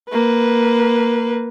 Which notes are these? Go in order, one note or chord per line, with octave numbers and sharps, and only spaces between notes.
A#3 B4